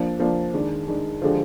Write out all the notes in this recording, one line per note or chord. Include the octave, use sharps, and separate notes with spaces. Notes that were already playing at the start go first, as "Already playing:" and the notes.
Already playing: F3 A#3 D4
F3 A#3 D4
D#3 G#3 D4
D#3 G#3 D4
D3 F3 G#3 D4 G4